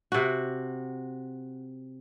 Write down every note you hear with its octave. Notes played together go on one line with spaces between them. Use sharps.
C3 F#4